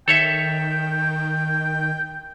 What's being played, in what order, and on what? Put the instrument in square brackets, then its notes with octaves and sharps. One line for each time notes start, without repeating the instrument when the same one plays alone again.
[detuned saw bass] D#3 [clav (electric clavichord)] A4 C#5 E5 [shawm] G5